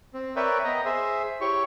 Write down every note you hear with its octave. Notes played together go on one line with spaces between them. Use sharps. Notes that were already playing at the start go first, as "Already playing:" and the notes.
C4
A#4 B4 C#5 D5 E5 G5
B3 D#5 A#5
G#4 C5 E5
E4 G4 C#5 C#6